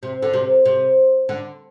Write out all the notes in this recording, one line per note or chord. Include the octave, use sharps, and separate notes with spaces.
C3
D3
C3
C3
D3